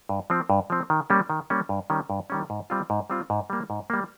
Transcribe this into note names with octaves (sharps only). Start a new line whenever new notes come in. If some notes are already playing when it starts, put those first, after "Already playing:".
G2
F3 C4
G2
F3 C4
D#3
G3 A#3 C#4
D#3
G3 A#3 C#4
G2
D#3 G3 C#4
G2
D#3 G3 C#4
G#2
G3 C4 F4
G#2
G3 C4 F4
G#2
G3 A#3
G#2
G3 A#3